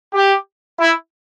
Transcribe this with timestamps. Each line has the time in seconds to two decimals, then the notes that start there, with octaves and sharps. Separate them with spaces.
0.13 G4
0.79 E4